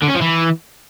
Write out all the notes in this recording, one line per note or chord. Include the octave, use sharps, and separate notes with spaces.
D3
C#4
F3
E3